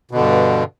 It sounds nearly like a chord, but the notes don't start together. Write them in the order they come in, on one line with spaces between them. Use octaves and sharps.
B2 D3 G2